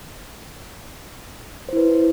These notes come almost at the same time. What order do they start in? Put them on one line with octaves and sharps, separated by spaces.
C5 E4 B4